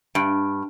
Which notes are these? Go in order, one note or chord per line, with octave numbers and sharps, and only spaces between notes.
G2